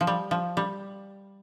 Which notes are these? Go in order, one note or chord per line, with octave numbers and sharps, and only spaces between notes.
F3
G3
F3
G3